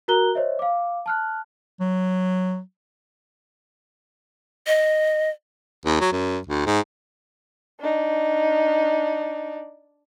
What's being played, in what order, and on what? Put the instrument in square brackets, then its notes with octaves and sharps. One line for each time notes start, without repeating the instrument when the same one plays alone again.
[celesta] F#4 A#4 A#5 F#6 G7
C5 C#5 D#5 E5
F5 D6
A5 F6 F#6
[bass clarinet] F#3
[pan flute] D#5
[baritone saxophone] D#2
F#3
F#2
D2
G#2
[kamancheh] D4 D#4